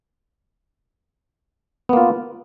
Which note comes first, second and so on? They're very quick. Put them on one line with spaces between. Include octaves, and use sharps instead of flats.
B3 A#3 F4